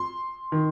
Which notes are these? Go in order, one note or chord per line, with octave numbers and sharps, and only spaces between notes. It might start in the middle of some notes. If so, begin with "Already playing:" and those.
Already playing: C6
D#3